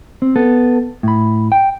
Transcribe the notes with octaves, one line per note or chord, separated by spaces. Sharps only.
C4
B3 A4
A2 B5
G5